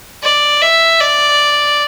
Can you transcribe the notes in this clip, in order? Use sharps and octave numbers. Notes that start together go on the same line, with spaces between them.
D5
E5
D5